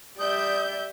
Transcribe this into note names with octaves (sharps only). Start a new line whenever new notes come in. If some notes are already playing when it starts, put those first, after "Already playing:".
G3 D5 E5 D#6 G6